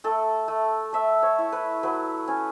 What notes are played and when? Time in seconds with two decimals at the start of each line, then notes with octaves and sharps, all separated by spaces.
0.04 A3 A4
0.48 A3
0.93 A3 E5
1.23 C#5
1.38 E4
1.52 B4
1.83 F#3 B4
2.28 C#4